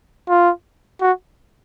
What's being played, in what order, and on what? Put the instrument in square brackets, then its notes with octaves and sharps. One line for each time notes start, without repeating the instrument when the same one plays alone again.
[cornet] F4
F#4